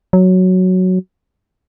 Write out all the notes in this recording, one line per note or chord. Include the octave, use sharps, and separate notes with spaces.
F#3